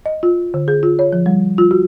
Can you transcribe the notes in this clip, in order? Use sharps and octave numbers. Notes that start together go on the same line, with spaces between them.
D#5
F4
D3
G#4
F4
C#5
F3
G3
F4
F#4